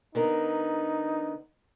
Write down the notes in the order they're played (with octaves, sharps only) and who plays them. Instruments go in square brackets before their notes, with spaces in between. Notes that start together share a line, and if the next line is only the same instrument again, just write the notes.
[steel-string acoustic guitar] D3 B3 A#4 [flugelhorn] D#4